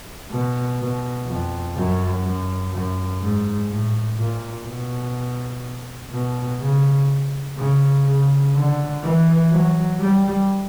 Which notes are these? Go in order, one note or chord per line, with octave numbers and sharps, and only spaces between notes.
B2
B2
F2
F#2
F#2
F#2
G#2
A2
A#2
B2
B2
C#3
C#3
C#3
D3
E3
F#3
G3